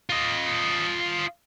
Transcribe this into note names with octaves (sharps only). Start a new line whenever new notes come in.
F4 D#5